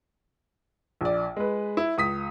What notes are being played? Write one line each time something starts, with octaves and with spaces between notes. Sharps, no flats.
A#1 D5
G#3 B4
E4
C#2 D#6 B6